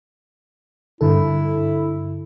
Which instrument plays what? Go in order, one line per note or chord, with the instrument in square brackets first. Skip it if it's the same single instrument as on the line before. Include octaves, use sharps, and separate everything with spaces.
[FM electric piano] G2 D3 A4 [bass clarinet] E4